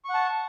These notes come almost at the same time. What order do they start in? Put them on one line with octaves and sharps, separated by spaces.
C#6 F#5 A5